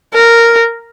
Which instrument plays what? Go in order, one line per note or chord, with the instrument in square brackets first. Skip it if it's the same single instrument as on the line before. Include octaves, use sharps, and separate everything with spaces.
[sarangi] A#4